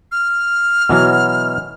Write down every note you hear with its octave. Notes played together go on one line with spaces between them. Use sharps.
F6
B2 E3 F#3